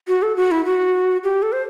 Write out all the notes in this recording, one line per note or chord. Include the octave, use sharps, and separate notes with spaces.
F#4
A4
F#4
E4
F#4
G4
A4
C5